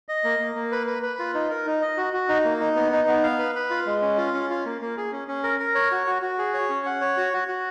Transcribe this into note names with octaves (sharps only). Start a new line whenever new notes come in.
D#5
A#3
A#3
A#3
B4
B4
B4
F4
D#4
A#4
D#4
D#5
F#4
F#4
D#4
A#3
D#4
B3
D#4
B3
F5
B4
B4
F4
G#3
C#4
F4
C#4
F4
A#3
A#3
G#4
C#4
C#4
A#4
A#4
C#5
F#4
F#4
F#4
G#4
C#5
C#4
F#5
C#5
F#4
F#4
F#4